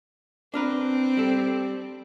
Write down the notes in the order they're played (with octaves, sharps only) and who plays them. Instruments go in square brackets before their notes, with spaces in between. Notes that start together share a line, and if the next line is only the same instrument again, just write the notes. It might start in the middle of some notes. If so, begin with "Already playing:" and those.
[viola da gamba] C4 [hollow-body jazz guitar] D4 A#4 B4
[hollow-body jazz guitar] G3 A4